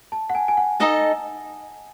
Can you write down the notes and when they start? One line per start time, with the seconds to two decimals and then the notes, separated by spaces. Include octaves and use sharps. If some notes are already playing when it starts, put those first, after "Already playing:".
0.12 A5
0.30 F#5
0.35 G#5
0.48 G#5
0.57 F#5
0.80 D#4 A4 D#5 A5